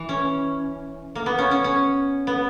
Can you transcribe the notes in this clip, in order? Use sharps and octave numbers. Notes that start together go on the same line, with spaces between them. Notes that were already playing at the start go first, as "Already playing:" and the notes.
Already playing: E3
C#4
A#3
B3
C#4
C#4
C#4
B3